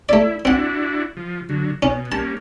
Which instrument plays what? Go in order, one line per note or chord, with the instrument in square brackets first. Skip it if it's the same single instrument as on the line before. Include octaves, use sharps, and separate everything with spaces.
[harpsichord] A3 D5 [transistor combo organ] E4
[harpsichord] C4 F#5 [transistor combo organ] D4 E4 F#4
[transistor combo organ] F3
D3 F#3
[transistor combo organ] B2 [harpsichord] C#4
[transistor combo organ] G3 A#3 C#4 [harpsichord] A5